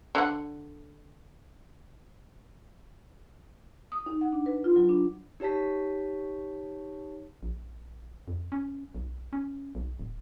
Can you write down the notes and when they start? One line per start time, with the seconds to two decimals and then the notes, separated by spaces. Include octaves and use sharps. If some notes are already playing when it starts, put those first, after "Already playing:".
0.15 D3 F#5
3.92 D#6
4.06 D#4
4.21 F#5
4.32 D4
4.46 B4
4.64 F4
4.76 F#3
4.89 D4
5.40 D#4 G4 C#5 A5 B6
7.43 A#1
8.28 F2
8.52 C#4
8.95 B1
9.33 C#4
9.75 B1
9.99 D1